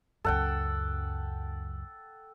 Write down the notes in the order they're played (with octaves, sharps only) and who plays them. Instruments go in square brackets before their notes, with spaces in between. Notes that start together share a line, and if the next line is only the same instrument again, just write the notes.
[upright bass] C#2 F#2 [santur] A4 F#5 G5